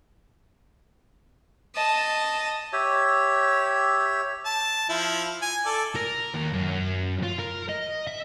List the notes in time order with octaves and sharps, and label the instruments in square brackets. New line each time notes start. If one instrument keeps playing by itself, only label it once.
[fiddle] D#5 A5
[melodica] G4 C#5 E5
[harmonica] A5
F3 E4
G#5
A4 D5
[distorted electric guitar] A#4
D#2
F#2
F4
A#4
D#5
E5